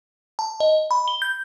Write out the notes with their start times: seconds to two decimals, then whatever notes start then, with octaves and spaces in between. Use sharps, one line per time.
0.39 A5
0.60 D#5
0.91 B5
1.08 G7
1.22 G6